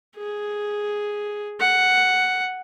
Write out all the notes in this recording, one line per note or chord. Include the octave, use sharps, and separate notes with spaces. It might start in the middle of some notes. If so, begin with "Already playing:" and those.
G#4
F#5